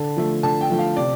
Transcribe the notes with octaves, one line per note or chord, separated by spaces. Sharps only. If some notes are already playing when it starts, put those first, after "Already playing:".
Already playing: D3 A5
F3 A3
D3 A5
G5
F3 A3
F5
C3 D5